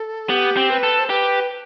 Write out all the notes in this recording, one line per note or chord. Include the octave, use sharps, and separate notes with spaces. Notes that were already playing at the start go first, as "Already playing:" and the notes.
Already playing: A4
B3 G4
C4
B4
A4
C5
G4 B4